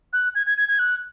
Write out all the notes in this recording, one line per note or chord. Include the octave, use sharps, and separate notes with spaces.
F#6
G#6
G#6
G#6
G#6
F#6